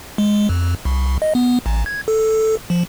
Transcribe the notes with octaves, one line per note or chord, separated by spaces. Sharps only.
G#3
F2
C2
D#5
B3
A1
G#6
A4
F3